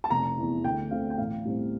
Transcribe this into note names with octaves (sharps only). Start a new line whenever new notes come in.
A5
F1 A#5
E2 E3
D2 G5
D3 A3 C4 F5
G5
A1 F5
A2 G3 C4